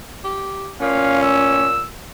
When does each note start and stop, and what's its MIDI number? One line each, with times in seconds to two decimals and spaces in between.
0.24 0.70 67
0.81 1.83 46
0.81 1.69 61
0.81 1.19 77
1.23 1.86 88